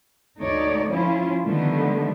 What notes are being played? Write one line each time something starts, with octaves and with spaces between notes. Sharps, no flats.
D2 A3 D#4 C#5 D5
F3 C#4 E4 F4
D3 D#3 F3 G3 A3 B3